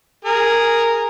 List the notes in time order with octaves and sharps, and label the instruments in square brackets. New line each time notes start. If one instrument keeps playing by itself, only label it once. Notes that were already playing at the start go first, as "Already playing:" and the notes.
[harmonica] G#4 A#4